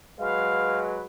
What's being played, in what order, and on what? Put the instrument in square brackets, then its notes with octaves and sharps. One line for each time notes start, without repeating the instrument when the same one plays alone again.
[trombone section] F#3 G#3 B4 [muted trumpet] F5